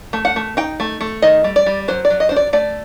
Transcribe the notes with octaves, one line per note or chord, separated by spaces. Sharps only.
A3
F#5
A3
D#4 G5
A3
A3
D#3 D#5
G3
D5
G3
F#3 C5
D5
F#3
D#5
D4 C5
D5
A3 D5